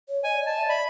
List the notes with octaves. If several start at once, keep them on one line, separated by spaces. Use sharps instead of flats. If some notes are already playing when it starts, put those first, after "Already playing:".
C#5
D#5 G#5
D5
D#5 A5
E5
D5 B5